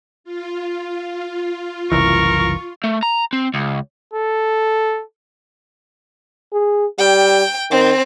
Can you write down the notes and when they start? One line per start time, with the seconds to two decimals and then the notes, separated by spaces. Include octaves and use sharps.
0.24 F4
1.92 F#1 C2 E3 A#4 C#6
2.84 A3
3.03 A#5
3.33 C4
3.54 C#2
4.14 A4
6.53 G#4
6.99 G3 G5
7.71 D#3 C4